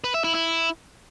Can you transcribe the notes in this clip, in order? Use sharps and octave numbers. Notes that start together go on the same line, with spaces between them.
B4
E5
E4
E4